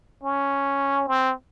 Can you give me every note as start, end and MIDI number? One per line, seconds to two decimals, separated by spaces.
0.23 1.07 61
1.08 1.33 60